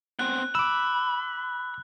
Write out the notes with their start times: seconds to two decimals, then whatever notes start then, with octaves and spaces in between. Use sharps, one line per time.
0.19 B3 C4 F#6
0.55 B5 D6 E6